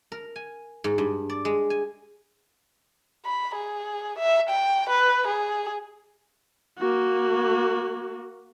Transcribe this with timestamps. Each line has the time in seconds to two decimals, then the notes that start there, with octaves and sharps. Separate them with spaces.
0.12 A#4
0.36 G#5
0.84 G#2
0.98 G2
1.30 D5
1.45 G#3
1.70 G#5
3.26 B5
3.56 G#4
4.19 E5
4.50 G5
4.90 B4
5.28 G#4
6.78 A#3 F#4